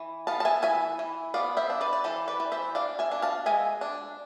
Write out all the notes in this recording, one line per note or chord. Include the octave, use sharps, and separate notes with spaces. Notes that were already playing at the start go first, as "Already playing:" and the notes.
Already playing: E3
B3 F5 A5
A5
E5 G#5
E3 E5 G#5
E3
B3 D5 F5
C5 E5
D4
B4 D5
D5
E3 A4 C5
B4 D5
E3
C5 E5
D4 D5 F5
E5 G#5
D4
F5 A5
G#3 E5 G#5
D4